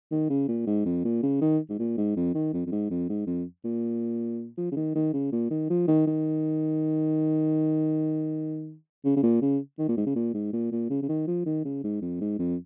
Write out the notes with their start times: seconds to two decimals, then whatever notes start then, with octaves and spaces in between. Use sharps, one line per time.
0.12 D#3
0.30 C#3
0.48 A#2
0.67 G#2
0.86 F2
1.05 A#2
1.23 C#3
1.41 D#3
1.69 G#2
1.79 A#2
1.97 G#2
2.16 F2
2.35 D#3
2.53 F2
2.66 F2
2.72 G#2
2.90 F2
3.09 G#2
3.27 F2
3.64 A#2
4.58 F3
4.72 C#3
4.76 D#3
4.95 D#3
5.14 C#3
5.32 A#2
5.51 D#3
5.70 F3
5.88 D#3
6.07 D#3
9.05 C#3
9.16 C#3
9.23 A#2
9.42 C#3
9.79 D#3
9.89 A#2
9.97 G#2
10.07 C#3
10.16 A#2
10.34 G#2
10.53 A#2
10.72 A#2
10.90 C#3
11.03 C#3
11.09 D#3
11.27 F3
11.46 D#3
11.65 C#3
11.84 G#2
12.02 F2
12.21 G#2
12.39 F2